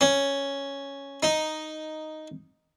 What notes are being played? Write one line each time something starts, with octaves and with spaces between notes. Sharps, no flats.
C#4
D#4